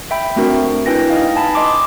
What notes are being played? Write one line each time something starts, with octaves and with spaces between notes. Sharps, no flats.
E5 G5 B5
A3 C4 D4 F#4 A#4
D4 E4 B4 G5 G#5 A#6
D#4 D#5 F5
G#5 A5 B5
D#5 C6 D6